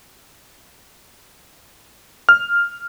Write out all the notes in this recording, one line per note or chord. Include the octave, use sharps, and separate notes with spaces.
F6